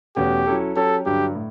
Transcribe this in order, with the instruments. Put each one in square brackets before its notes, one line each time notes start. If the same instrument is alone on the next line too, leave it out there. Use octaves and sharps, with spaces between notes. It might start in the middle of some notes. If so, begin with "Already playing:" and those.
[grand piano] E2 B2 A3 C#4 F#4 [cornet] G4
[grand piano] F#3 C#4 E4 A4
[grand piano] F#3 C#4 G4 C#5 [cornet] A4
[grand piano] G2 D3 F#3 [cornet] G4
[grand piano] A2